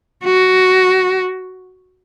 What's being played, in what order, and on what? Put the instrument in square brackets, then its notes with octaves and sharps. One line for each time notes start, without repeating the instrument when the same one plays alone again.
[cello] F#4